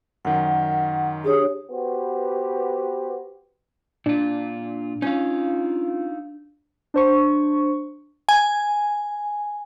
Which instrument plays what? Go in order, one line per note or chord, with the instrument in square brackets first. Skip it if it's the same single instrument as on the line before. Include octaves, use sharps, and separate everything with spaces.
[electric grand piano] F#2 D#3 [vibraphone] F#5
[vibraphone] D4 G4 C#5 [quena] G#4
[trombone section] B3 F#4 G4 B4 C5
[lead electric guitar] A#2 F4 [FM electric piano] D4
[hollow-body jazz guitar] C#4 [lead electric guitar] D#4 F5 [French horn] F4
[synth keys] D4 C5 C#6
[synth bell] G#5